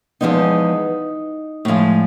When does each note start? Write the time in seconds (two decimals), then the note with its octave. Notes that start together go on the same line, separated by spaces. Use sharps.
0.21 E2 C#3 F3 G#3 B3 D#4
1.65 A2 F3 G#3